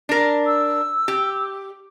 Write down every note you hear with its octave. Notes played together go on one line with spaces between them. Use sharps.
D4 A#4
E6
G4